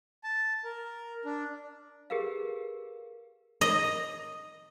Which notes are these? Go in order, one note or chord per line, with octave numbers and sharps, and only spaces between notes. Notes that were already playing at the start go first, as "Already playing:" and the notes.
A5
A#4
D4
G4 G#4 A#4 B4 F5
D#5